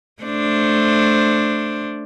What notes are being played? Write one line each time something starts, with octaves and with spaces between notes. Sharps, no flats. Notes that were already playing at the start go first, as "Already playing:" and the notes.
A3 D4 C5